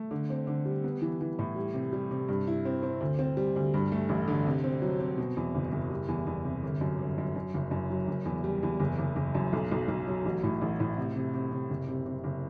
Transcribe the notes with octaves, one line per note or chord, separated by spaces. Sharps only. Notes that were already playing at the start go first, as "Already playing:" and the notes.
Already playing: A3
D3
C4
D3
G3
B3
E3
E3
A2
G3
C3
G3
C3
G2
E4
C4
C4
D2
C4
G3
D2
G2
A3
A1
D3
C3
C4
F#3
C4
B2
E2
F#1
F#1
G3
E2
E2
C3
G1
F#2
G1
F#2
F#2
F#1
F#2
F#3
F#1
E2
G3
E2
F#1
F#1
F#1
F#2
B1
B1
B1
F#3
A1
A2
A1
A2
C3
C3
C3
C3
F#1
C3
C3
F#1